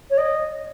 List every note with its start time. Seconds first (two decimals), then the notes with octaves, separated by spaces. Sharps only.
0.10 C#5
0.18 D#5